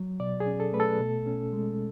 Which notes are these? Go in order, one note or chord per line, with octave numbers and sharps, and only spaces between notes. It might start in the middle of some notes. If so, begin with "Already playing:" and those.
Already playing: F#3
B2 D5
G#4
C#4
A4
A3 B4
A4
B2
C#4
G#3